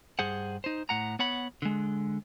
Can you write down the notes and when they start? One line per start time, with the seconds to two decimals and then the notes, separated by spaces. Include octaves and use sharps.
0.19 G2 G#4 C5 F#5
0.64 D#4 C5
0.89 A2 F#5 A#5
1.19 B3 C#5 F#5 B5
1.62 D3 G#3